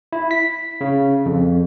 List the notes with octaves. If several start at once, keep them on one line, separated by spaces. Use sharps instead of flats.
E4
B6
C#3
F2